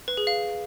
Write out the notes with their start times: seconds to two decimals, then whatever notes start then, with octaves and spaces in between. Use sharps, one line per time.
0.08 B4
0.17 G#4
0.27 F5